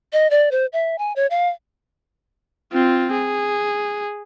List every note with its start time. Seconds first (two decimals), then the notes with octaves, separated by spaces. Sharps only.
0.13 D#5
0.31 D5
0.51 C5
0.73 E5
0.98 G#5
1.16 C#5
1.30 F5
2.73 C4 F4
3.12 G#4